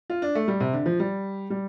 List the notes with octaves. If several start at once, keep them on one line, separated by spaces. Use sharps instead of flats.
F4
D4
A3
G3
C3
D3
F3
G3
G3